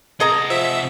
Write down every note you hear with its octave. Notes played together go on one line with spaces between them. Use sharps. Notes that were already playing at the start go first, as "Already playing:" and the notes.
C3 G#4 D#5 F#5 A#5
F3 E5